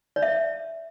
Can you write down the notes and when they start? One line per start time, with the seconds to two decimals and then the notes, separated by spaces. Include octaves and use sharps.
0.16 D5
0.22 E5